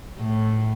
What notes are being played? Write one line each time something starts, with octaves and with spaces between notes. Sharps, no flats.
A2